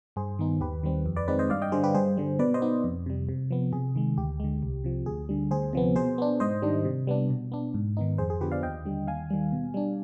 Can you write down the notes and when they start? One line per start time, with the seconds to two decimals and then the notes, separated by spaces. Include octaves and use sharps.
0.16 G2 G#4 C5
0.39 D#3 B3 D#4
0.61 D#2 G4 B4
0.83 D#3 G3 C4
1.06 F2
1.16 B4 D5
1.28 D#3 G#3 C4 D#4 B4 D5
1.39 C5 D#5
1.50 G2 D5 F5
1.62 D#5 G5
1.72 D3 G3 G#4 C5
1.83 G4 B4
1.94 G2 G#4 C5
2.17 D3 G3
2.39 B2 B4 D5
2.54 C5 D#5
2.62 B3 D#4
2.84 F2
3.06 C3 G3
3.29 C3
3.51 F3 B3
3.73 C3 G#4
3.96 D#3 G#3
4.18 D2 G4
4.40 D3 G#3
4.63 C2
4.84 C3 F3
5.06 D2 G#4
5.29 D3 G3
5.51 D2 G#4 C5
5.73 C3 F3 B3
5.95 B2 G#4 C5
6.18 B3 D4
6.40 G#2 C5 D#5
6.62 D#3 G3 D4
6.85 C3
7.07 G3 B3 D4
7.30 B2
7.52 B3 D4
7.74 G#2
7.97 D#3 B3 D#4
8.18 F2 G#4 C5
8.30 G#4
8.41 D3 F3 B3 G4 B4
8.52 D5 F5
8.63 D#2 D#5 G5
8.85 D3 G3
9.07 D#2 F5 G#5
9.30 D#3 G3
9.52 B2
9.74 G3 D4